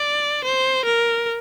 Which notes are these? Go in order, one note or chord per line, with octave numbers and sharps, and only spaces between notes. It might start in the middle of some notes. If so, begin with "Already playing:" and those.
Already playing: D5
C5
A#4